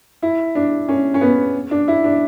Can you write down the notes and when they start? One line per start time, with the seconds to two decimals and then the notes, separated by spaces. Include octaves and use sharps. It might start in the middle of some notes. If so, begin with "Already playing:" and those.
0.22 E4
0.55 D4
0.89 C#4
1.14 C#4
1.21 B3
1.71 D4
1.88 E4
2.04 D4